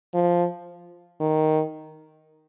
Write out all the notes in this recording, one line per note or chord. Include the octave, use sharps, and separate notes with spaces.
F3
D#3